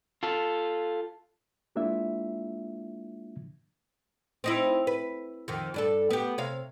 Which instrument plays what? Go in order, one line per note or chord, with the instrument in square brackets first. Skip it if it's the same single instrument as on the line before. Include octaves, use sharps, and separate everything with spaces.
[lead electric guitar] F4 A4
[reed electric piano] G#3 A#3 D4 E4 F4 E5
[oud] C4 D#4 E4
B4
F2 D#3
G2 D4 A4
B3 G4
C3 C#5 F5